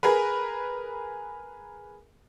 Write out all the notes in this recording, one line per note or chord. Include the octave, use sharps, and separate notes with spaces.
G#4 A#4 B4